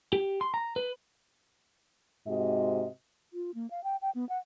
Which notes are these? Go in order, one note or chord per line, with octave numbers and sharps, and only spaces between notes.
G4
C6
A#5
B4
G#2 C3 F#4 D#5
F4
A#3
F5
G5
G5
B3
F#5